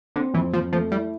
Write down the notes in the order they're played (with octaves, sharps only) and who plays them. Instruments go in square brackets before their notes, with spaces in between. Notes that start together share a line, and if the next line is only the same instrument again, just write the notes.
[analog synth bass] D3 [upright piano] C4
[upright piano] F2 [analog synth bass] E3
[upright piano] F2 [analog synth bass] F3
[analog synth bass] F3 [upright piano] A3
[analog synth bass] G3 [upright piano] E4